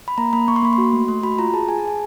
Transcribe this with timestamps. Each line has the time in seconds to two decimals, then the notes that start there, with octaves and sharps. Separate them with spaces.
0.08 B5
0.18 A#3 A#5
0.33 A#3 B5
0.48 A#3 C#6
0.56 C6
0.63 A#3 B5
0.73 C6
0.78 F#4
0.93 A3
1.08 A3 C6
1.23 F#4 B5
1.38 F4 A#5
1.54 G#4 A5
1.69 G#4 G#5
1.78 A5
1.84 G#4 G#5